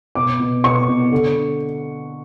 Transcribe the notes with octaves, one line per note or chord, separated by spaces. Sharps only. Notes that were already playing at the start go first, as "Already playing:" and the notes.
B2 D6
B2
B2 C#6
B2
D3